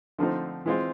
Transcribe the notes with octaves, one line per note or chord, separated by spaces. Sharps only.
D3 F3 A3 C4 D#4
E3 G#3 C4 F4